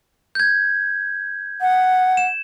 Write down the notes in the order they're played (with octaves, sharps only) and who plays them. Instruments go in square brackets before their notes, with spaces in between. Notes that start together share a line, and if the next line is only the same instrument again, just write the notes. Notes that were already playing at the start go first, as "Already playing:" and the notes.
[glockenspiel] G6 G#6
[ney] F#5
[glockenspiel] E7